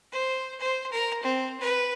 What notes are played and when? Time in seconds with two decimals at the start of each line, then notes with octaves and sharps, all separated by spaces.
0.12 C5
0.60 C5
0.92 A#4
1.22 C4
1.60 B4